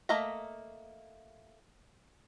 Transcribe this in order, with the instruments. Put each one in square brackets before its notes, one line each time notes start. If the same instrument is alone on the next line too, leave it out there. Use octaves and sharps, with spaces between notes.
[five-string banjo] A3 A#3 D#5 E5 A#5